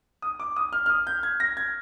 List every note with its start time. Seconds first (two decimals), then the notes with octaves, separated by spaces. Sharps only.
0.22 D#6
0.40 D6
0.56 D#6
0.73 F6
0.86 F6
0.90 D#6
1.07 G6
1.23 G#6
1.40 A#6
1.57 G#6